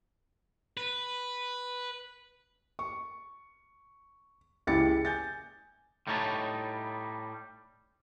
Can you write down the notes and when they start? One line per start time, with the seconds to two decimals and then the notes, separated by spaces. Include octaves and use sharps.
0.77 B4
2.79 C#6
4.67 C#2 C#3 E4 G4 A6 C#7
5.05 G#5 G6 A6
6.07 A2 G3 A3 D#4 C#5 A5